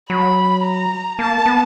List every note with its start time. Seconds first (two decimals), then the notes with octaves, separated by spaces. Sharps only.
0.10 F#3 B5
0.65 A#5
1.19 A#3 A5
1.46 B3